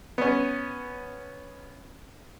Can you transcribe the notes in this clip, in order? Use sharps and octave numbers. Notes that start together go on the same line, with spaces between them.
B3 C#4